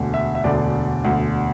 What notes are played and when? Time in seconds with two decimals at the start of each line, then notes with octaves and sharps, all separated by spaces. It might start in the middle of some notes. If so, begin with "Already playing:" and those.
Already playing: E1 D2 D3
0.14 E5
0.35 E5
0.44 E1 D2 D3 D5
1.04 E1 D2 D3